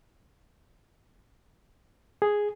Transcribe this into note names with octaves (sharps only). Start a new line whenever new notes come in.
G#4